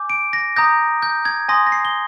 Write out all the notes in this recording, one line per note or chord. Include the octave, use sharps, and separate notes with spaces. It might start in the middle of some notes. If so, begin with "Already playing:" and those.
Already playing: G#5 D6 G6
D7
A#6
A#5 D#6 G6 A#6
G6
G#6
G#5 C6 D#6 A#6
A#6
C7
G7